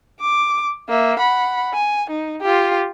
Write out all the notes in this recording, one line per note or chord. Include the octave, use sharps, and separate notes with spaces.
D6
A#3 E5
F#5 B5
G#5
D#4
F4 G4